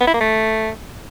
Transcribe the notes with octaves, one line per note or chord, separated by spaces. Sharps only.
B3
E4
A#3
A3